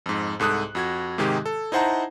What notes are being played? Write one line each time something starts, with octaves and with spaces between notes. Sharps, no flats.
F2 G#2
C2 G#2 A4 D#6 F#6
F2 F#4 G#6
G#2 C3 D#3 G#3 D#4 G4
A4
D#4 E4 C5 F#5 A5 A#5